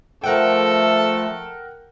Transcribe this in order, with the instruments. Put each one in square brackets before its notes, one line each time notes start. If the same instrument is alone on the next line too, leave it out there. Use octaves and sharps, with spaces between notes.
[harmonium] F3 A3 [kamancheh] A4 [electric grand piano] A#4 F#5 G5